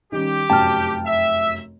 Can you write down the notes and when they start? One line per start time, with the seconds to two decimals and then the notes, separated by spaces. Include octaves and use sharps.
0.12 D#3 G3 C#4 G4
0.50 F1 F#2 G5 A5 F6
1.05 E5